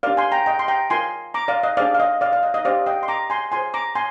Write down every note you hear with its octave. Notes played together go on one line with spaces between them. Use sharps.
D4 G4 A#4 D5 F5
G#5 C6
G5 A#5
D#5 G5
C6
G5 A#5
F4 A#4 G#5 C6
A#5 D6
D5 F5
D#5
D4 G#4 C5 D5 F5
F5
D#5
D5 F5
D5 F5
D#5
D#5
D4 G4 C5 D5 F5
D#5 G5
C6
A#5 D6
G#5 C6
F4 G#4 C5 G#5 C6
A#5 D6
G#5 C6